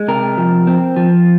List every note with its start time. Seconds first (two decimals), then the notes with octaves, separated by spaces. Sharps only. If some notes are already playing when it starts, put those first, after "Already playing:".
Already playing: G#3
0.08 C3 A#4
0.38 F3
0.67 C4
0.96 F3